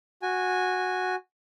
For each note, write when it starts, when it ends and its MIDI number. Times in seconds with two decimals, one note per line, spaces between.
0.22 1.15 66
0.22 1.15 80